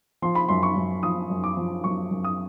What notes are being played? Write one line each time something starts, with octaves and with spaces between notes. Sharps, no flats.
F3 C6
B5
F#2 C6
C#6
F#2
F3 D#6
F#2
D6
F3
F#2 C#6
F#2
D#6